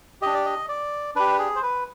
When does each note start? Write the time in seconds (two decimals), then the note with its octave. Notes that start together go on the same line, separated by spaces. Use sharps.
0.22 D4 G4 D#5
0.34 D5
0.46 D#5
0.69 D5
1.16 D4 G4 B4
1.39 G#4
1.55 C5
1.63 B4